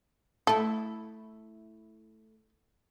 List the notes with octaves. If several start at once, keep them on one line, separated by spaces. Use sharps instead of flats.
A3 E4 A4